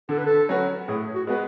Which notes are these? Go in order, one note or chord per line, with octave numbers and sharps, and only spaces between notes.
D3 A4
B4
A4
F#3 C#4 F#4 B4
A2 G#4
F#4
G#3 B3 F#4 B4